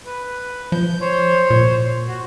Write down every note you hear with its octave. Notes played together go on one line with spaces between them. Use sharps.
B4
F3 G6
C5 C#5
A#2
F#4